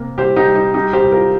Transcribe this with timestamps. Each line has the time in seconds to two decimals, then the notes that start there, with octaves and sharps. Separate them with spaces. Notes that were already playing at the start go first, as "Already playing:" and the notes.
Already playing: C3 A#3
0.17 C2 G4 C5
0.36 D#4 G4
0.47 G3
0.56 D#4
0.74 G3 D#4 G4
0.93 G4 C5
1.04 C2
1.12 F4 A#4